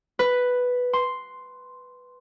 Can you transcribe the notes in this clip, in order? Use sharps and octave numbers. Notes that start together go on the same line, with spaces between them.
B4
C6